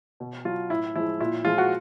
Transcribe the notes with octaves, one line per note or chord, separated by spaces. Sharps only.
B2
F#3 F4
A2 E4
F3 G#3 E4
A#2 E4
F3 G#3 F4
F#4